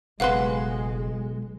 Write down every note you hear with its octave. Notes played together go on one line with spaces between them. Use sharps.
F#1 B1 G#3 B4 F5 F#5 C6 F#6